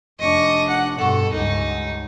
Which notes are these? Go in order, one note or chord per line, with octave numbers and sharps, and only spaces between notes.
F1 D4 D#5 C#6
F#5
G2 B2 A4 F#5 C#6
C#2 G2 D#4